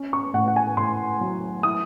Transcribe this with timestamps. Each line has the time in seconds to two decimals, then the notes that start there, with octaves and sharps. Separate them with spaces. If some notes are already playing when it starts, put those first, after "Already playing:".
Already playing: C#4
0.13 C#6
0.34 A2 F#5
0.48 F#5
0.56 G#5
0.77 A2 C6
1.21 F#3
1.63 E4 D#6